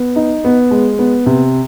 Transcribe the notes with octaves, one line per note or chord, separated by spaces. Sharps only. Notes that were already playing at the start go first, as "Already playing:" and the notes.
Already playing: B3
D#4
B3
G#3
B3
C3